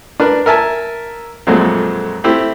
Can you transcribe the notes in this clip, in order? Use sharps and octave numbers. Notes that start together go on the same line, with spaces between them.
D4 A#4 B4
A#4 E5 G#5 A5
F2 A#2 F#3 G#3 A3 C4
A3 C4 E4 G4